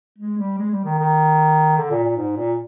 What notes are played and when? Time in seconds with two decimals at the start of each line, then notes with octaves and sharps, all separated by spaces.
0.18 G#3
0.38 G3
0.59 G#3
0.71 G3
0.84 D#3
0.98 D#3
1.77 D3
1.91 A#2
2.04 A#2
2.17 G#2
2.37 A#2